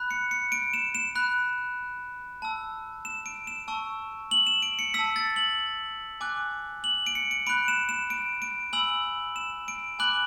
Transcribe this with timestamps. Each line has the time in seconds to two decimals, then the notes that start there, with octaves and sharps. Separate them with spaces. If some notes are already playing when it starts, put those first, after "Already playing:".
Already playing: B5 F#6
0.11 C#7
0.31 C#7
0.52 D7
0.74 E7
0.95 E7
1.15 B5 F#6
2.42 A5 E6
3.05 E7
3.26 D7
3.47 E7
3.68 A5 C#6 E6
4.31 F#7
4.47 E7
4.62 D7
4.79 C#7
4.94 A5 E6 B6
5.16 A6
5.36 F#7
6.21 G#5 D6 F#6
6.84 F#7
7.07 D7
7.15 C#7
7.31 D7
7.47 B5 F#6 D7
7.68 E7
7.89 E7
8.10 D7
8.42 D7
8.73 G#5 B5 E6 F#7
9.36 E7
9.68 D7
9.99 G#5 B5 D6 F#6 F#7